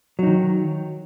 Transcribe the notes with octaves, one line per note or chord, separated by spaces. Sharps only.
D#3 F#3 D#4